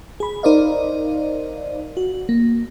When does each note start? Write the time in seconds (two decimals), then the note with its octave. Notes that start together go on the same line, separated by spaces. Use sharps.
0.20 G#4 B5
0.43 D#4 A#4 C5 D5 D#5 F5
1.97 F#4
2.29 A#3